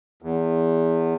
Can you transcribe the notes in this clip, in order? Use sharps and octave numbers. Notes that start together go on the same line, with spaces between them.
E2